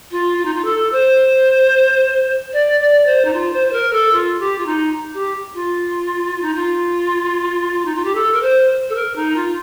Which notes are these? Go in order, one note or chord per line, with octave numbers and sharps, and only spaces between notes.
F4
F4
D#4
F4
A4
C5
D5
D5
C5
D#4
F4
C5
C5
A#4
A4
F4
G4
F4
D#4
G4
F4
D#4
F4
D#4
F4
G4
A4
A#4
C5
A4
A#4
D#4
F4